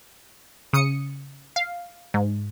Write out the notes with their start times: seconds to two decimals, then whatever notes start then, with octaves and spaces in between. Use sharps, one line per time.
0.73 C#3 D#6 C#7
1.56 F5
2.14 G#2